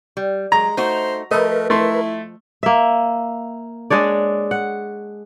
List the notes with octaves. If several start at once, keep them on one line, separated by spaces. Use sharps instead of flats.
G3
F#3 G#3 A#5
A3 D#4 F#4 C5
F3 A3 A#4 B4 D#5
A3 E4 C6
A#3 E5
G#3 D4 C#5 D5
F#5